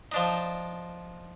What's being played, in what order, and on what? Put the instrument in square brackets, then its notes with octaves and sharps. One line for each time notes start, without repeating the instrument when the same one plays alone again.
[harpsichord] F3 D4 D#4